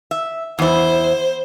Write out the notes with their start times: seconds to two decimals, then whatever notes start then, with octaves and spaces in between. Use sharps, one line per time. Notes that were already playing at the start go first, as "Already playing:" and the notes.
0.11 E5
0.59 E2 E4 C5